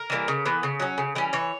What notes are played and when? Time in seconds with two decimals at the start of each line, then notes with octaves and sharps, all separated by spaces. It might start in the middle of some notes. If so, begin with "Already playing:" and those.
Already playing: A#4
0.10 E3 G3 A#3
0.28 C#3
0.45 E3 B3
0.63 C#3
0.80 F#3 C#4
0.98 C#3
1.15 E3 G3 C#4
1.33 E3 C#5